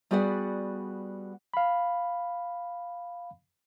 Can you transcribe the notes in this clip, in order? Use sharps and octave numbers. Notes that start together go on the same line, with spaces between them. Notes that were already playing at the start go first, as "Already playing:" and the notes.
G3 B3 F#4 G#4 D5 F#5
F5 B5